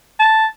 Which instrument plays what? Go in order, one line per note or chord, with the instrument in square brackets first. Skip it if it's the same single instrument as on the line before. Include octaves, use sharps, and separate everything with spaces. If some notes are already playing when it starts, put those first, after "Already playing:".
[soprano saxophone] A5